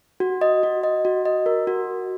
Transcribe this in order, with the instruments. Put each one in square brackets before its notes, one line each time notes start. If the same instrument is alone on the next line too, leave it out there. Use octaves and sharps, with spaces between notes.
[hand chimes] F#4
D#5
F#4
D#5
F#4
D#5
A#4
F#4